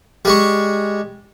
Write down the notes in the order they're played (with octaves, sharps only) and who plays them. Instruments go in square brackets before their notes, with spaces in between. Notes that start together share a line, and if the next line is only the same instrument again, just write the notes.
[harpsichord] G3 G#3 C#6